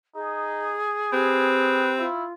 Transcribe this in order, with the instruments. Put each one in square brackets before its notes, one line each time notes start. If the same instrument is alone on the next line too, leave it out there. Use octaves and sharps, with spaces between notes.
[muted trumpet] D#4 [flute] G#4
[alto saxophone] C4 [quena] G4 [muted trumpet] B4
[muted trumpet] E4 [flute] F4